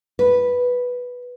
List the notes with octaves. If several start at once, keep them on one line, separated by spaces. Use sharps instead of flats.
B4